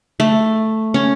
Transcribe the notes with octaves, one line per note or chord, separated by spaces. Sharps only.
A3
C#4